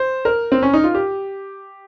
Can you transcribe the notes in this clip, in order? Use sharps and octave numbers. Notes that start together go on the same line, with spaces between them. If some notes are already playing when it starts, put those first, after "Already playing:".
Already playing: C5
A#4
C4
C#4
D#4
F4
G4